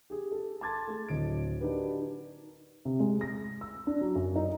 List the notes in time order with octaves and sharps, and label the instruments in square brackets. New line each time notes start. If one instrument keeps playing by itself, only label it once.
[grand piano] G4 G#4
A4
A5 C6 D6 G#6 A6
A3 G#4
D1 D3 D#5 D7
D4 D#4 F#4 G4 A#4 B4
[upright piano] C3
G#3
A#6
E6
D4
F#3
F#2
D#4